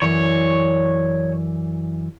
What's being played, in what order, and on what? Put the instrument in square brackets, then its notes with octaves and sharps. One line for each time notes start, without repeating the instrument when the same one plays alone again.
[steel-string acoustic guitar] F#2 E3 D5 [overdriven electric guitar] C#5